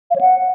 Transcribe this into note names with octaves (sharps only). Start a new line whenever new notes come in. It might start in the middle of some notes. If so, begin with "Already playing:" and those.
F5
C#5
F#5